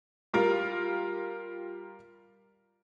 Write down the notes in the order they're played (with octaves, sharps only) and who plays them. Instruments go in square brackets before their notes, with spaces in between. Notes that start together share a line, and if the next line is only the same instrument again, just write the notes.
[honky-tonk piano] G3 F4 A#4